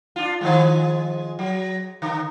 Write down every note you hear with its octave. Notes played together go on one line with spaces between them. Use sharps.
D4 F4
D#3 F3 G#3
F#3
D3